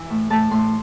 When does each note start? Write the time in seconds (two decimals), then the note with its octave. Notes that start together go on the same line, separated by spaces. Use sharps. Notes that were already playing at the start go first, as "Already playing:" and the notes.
Already playing: E3
0.10 A2
0.30 A2 A5
0.51 A2 C6